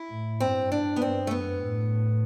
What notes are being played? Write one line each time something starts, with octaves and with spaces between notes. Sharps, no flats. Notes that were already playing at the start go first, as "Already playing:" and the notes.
Already playing: E4
A2
G2 C4
D4
B3
G2 C4
A3
F#2 B3
A2